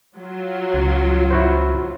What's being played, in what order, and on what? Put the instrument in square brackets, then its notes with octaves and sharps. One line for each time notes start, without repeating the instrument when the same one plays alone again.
[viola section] F#3 F4
[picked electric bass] C#2
[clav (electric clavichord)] E4 F#4 C5